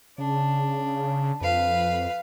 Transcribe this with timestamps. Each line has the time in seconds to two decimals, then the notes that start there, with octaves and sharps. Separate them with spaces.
0.18 C#3 D4
1.41 F2 B4 F5